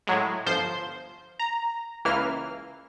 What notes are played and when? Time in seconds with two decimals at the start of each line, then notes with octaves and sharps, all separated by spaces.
0.07 A2 F#3 G#3
0.46 G1 F3 C5 C6 G6
1.39 A#5
2.05 C#2 E3 A#3 F6